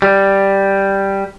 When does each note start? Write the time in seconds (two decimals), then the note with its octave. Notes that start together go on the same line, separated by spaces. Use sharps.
0.02 G3